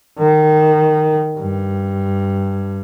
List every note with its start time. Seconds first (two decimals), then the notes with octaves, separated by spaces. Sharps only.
0.19 D#3
1.38 G2